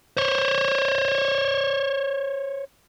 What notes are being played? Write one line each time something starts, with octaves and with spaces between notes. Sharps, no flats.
C5 C#5